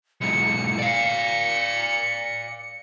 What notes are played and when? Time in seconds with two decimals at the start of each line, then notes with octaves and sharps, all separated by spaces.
0.21 B1 G#2 C#7
0.79 D5 F5